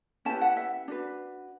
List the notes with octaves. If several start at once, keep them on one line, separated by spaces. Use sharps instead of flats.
C#4 E4 G4 B4 A5
F#5
E5
D4 F#4 B4